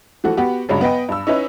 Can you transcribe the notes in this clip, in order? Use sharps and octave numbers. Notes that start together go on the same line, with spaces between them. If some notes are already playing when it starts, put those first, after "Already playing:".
E3 F3 A3 F#4
B3 F#4 G4
G2 C#3 F#3 G#3
B3 B4 D#5 G5
G2 E6
C#4 D#4 E4 B4